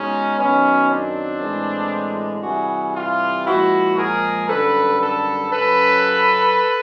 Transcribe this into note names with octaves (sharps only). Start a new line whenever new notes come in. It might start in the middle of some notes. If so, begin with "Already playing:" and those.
Already playing: B2 G#3 C#4 D#4
F#2 D#3 F#3 B3 C#4
C4 D4
A2 E3 G#3
C3 E3 G3 F#4 G#4
F4 G4
A#2 F3 G#3 E4 F#4
G#4 A#4
F#2 D3 G3 A4 B4
A4 B4
F#2 C#3 F#3 A4 B4